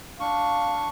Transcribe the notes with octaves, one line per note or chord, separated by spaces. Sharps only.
D4 F5 C#6